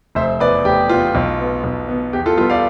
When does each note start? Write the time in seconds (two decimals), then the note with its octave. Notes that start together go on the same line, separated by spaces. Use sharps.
0.15 F1 C5 E5
0.40 E2 B2 B3 B4 D5
0.65 F1 G4
0.89 E2 B2 B3 F4
1.15 B1
1.39 B2 B3
1.64 B1
1.88 B2 B3
2.13 E2 G4
2.26 F4 A4
2.38 B2 G3 B3 F4 A4
2.50 D5 F5